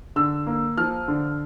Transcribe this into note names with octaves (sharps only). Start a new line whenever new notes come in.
D3 E6
A#3
F3 F6
D3